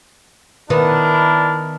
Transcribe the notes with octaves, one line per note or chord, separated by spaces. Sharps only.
D#3 B3 D4 E4 A#4